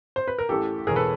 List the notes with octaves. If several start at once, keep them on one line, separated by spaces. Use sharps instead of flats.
C5
B4
A#4
A1 A2 E3 G4 A4
E1 E2 B2 G#4 A#4
A4 B4